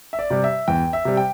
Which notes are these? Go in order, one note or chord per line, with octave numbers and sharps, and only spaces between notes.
E5
D5
C3 G3
E5
E2 G5
E5
C3 G3
G5